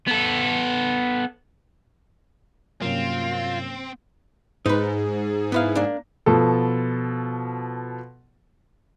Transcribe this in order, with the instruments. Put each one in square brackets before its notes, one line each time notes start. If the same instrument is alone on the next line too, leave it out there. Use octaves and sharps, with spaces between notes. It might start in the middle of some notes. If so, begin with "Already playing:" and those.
[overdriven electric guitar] B3 A4
[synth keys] G2 C3 F#3 [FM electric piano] A#3 C#4 [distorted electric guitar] C4 [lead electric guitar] F4
[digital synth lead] G#2 [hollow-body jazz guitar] D#4 B4
[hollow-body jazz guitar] B3 E4 F5
A#3 D4
[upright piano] B2 F3 A4